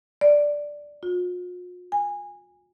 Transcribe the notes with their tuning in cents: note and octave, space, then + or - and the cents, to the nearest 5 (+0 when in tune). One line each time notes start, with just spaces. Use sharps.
D5 +0
F4 +45
G#5 -20